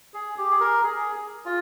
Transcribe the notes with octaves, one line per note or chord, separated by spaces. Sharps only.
G#4
G4
G#4
A#4
G#4
F4